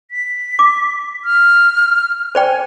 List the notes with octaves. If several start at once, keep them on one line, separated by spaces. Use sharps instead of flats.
B6
D6
F6
C5 D5 G5 G#5